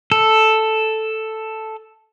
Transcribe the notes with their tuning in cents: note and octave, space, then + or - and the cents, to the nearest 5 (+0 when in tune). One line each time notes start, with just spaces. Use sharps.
A4 +0